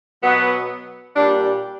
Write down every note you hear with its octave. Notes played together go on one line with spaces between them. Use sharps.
B2 F#3 B3
A#2 G3 D4